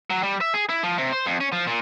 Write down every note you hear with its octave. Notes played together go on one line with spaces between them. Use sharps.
F#3
G3
E5
G#4
E4
F3
C3
C5
F2
C#4
F3
A#2